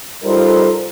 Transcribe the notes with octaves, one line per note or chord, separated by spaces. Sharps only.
G3 D#4 F4 A4 A#4 C5